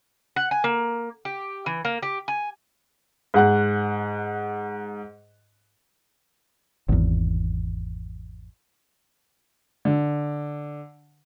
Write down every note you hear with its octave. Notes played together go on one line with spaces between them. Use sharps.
F#5
G#5
A#3
G4
E3
A#3
G4
G#5
G#2 F#5 F#6
G#1 E2
D3